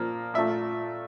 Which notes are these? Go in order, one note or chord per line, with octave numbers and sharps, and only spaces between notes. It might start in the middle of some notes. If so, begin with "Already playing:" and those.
Already playing: A#2 F3 A#3
A#2 A3 E5